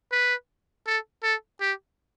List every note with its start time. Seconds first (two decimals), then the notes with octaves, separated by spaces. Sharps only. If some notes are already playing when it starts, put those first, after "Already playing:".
0.12 B4
0.86 A4
1.23 A4
1.61 G4